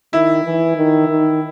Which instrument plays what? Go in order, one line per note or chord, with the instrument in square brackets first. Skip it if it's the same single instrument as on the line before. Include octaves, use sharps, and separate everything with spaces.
[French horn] D#3 [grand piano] E4
[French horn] E3
D#3
D#3